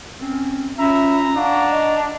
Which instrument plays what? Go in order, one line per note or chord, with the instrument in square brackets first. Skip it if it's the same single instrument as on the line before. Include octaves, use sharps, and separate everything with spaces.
[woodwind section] C4 C#4
[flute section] C#4 F4 B5 [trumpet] E5 [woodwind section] A#5
[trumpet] D4 [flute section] F5 F#5 C#6
[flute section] D#5